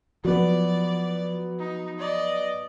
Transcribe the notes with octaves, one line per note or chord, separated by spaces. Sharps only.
F3 F#3 B3 D5
D#4
D5 D#5